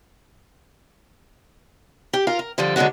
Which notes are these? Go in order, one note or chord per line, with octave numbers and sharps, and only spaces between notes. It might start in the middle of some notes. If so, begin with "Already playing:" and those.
G4
F4 A#4 F5
A#4
D3 F3 G3 A4
D3 F#3 G#3 B3 F#4